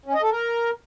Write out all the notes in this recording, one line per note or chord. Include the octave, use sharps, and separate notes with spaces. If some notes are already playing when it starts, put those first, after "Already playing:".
C#4
D#5
A4
A#4